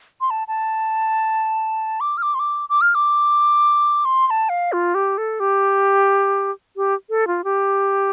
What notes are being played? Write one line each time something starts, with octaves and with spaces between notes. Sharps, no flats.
C6
A5
A5
D6
F6
D6
C6
D6
D6
F6
D6
C6
C6
A5
F5
F4
G4
A4
G4
G4
A4
F4
G4